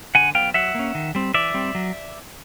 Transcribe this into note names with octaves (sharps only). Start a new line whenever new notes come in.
D3 F#5 G#5
F#3 B3 F5 G5
F#3 E5 F#5
A#3 C#4
D#3
G3 C4
E3 D5 E5
G3 C4
F#3